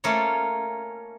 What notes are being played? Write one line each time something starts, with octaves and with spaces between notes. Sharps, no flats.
A3 A#3 C#4 F4 A#4 C#5